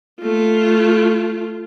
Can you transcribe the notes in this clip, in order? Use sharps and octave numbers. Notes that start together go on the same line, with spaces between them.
A3 F4